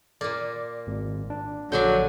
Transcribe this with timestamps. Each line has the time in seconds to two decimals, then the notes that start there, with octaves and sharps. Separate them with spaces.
0.21 A#2 A#3 D5
0.87 G#1
1.30 D4
1.72 A#1 D3 F#3 D4 G#5 G6